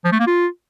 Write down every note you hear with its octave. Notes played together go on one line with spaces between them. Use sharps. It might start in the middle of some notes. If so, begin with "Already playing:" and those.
F3
A3
A#3
F4